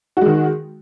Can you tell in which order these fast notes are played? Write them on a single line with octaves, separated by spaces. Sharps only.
F#4 G#3 D#3